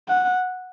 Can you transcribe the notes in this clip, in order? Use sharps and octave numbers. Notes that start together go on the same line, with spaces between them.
F#5